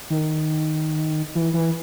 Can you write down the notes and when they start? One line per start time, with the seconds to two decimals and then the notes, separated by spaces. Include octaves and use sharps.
0.10 D#3
1.35 E3
1.54 E3